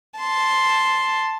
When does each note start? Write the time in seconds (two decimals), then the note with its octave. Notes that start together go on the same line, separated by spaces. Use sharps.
0.19 A5 C6